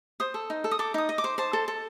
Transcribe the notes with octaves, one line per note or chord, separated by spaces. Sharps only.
C5 D#6
A4
D#4
A4
D#6
A4 D6
D#4 D#6
D#5
D6
C5
C5 A5
A4
A4